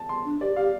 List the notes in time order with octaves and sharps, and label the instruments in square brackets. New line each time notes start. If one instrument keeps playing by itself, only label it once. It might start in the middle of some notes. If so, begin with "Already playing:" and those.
Already playing: [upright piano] A5
C6
[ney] D4
[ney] G4 [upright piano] D5
[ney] G4 [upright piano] F5